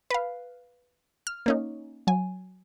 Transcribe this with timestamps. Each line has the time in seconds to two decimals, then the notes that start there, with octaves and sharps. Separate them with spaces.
0.10 B4 F5
1.27 F6
1.46 A#3 C#4 D#4
2.07 F#3 G#5